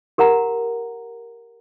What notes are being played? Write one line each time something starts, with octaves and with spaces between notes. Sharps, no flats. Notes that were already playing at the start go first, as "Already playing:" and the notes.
G4 A#4 F#5 A#5